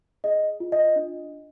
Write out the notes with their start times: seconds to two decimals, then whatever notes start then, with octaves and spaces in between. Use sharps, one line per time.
0.24 G#4 D#5
0.60 F4
0.72 D#5
0.96 D4